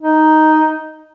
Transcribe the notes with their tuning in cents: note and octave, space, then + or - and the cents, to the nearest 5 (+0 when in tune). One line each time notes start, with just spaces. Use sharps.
D#4 +0